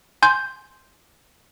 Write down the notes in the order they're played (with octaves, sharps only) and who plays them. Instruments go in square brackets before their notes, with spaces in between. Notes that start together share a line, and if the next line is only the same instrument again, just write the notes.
[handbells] G#5 C6 G6